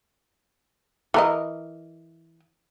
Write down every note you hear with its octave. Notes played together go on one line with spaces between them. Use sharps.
E3 A#4 D#5